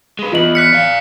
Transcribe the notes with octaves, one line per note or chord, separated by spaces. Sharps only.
G#3 B4
E2 F4 D#5 F#7
F6 F#6 B6 C#7
D5 F5